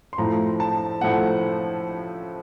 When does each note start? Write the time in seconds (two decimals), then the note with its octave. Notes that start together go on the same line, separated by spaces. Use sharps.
0.13 C6
0.18 A2 F3 A3 C4 A#5
0.60 A5
1.01 A2 F3 A3 C4 F#5